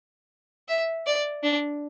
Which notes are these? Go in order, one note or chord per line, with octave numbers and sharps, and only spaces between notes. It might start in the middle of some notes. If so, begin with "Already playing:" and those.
E5
D5
D4